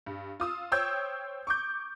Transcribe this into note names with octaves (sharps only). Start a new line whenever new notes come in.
G2
F4 D#6 E6
C5 C#5 G5 E6 G6 G#6
C#6 D6 G6